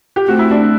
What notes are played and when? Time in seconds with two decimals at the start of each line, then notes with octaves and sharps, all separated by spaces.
0.16 G4
0.27 A3 C4 F#4
0.39 E4
0.51 D4